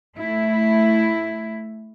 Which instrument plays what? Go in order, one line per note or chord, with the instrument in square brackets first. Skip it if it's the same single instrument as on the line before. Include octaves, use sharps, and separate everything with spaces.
[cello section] A3 E4